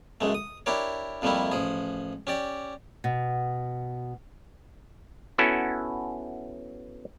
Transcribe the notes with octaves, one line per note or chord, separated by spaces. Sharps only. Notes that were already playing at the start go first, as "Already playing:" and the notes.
C#2 F#2 G#3 A3
D#6
D4 E4 G4 A#4 C#5
F2 F3 G3 A3 A#3 E4
A1 F3 G#4
C#4 G4 D5
B2
B3 C#4 E4 F#4 A4